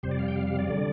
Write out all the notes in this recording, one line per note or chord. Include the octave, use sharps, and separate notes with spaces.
F2 C3 G3 C5
D5
F5
G5
F5
F5
D5
D3 G3